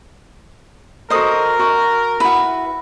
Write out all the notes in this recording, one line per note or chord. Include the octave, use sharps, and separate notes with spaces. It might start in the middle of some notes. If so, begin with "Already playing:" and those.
F#4 A4 A#4 C5 D#5 D#6
F#4
E4 F#4 B4